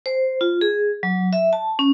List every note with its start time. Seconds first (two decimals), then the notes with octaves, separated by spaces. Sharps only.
0.06 C5
0.41 F4
0.61 G#4
1.03 F#3
1.33 E5
1.53 A5
1.79 C#4